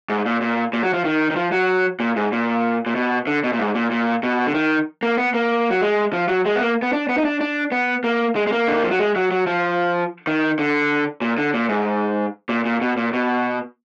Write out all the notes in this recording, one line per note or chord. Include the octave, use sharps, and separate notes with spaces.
G#2
A#2
A#2
A#2
F#3
F3
D#3
D#3
F3
F#3
A#2
G#2
A#2
A#2
B2
D3
B2
A#2
G#2
A#2
A#2
B2
D3
D#3
A#3
B3
A#3
F#3
G#3
F3
F#3
G#3
B3
A#3
B3
D4
B3
D#4
D4
D4
B3
A#3
G#3
G#3
A#3
D3
D#3
F3
F#3
G#3
F#3
F#3
F3
D#3
D3
A#2
D3
A#2
G#2
A#2
A#2
B2
A#2
B2